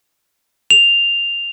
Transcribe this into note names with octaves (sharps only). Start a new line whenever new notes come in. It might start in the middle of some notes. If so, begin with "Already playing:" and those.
F7